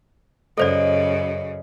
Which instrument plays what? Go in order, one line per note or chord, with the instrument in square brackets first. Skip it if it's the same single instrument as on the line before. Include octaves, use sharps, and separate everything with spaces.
[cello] F#2 C#3 [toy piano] A4 C5 D5 [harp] D#5